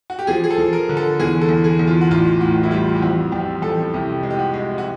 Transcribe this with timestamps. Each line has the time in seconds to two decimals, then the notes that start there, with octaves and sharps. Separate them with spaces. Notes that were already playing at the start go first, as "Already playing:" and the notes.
0.10 F#4
0.19 G4
0.27 F3 G#4
0.44 G#4
0.50 A4
0.58 F3
0.73 A#4
0.89 D3
0.97 A4
1.20 E2 G#4
1.41 A4
1.49 E2
1.64 G#4
1.79 E2
1.88 F4
2.01 F#4
2.11 A1 F4
2.41 A2 F#4
2.63 E4
2.71 G3 F4
2.96 G4
3.02 F2 F#4
3.32 F2 G4
3.62 F2 A4
3.94 C2 G4
4.23 G#3
4.30 G4
4.39 F#4
4.53 G#3
4.78 F#4